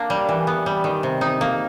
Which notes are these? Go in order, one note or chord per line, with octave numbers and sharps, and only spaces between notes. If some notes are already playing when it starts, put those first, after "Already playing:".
Already playing: A#3 D4
G3
E3
B3
G3
D#3
C3
D#4
A#3